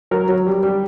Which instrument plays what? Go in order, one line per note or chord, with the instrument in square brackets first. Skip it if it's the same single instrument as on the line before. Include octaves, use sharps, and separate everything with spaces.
[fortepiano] F#3 A#4
F#3
G3
G3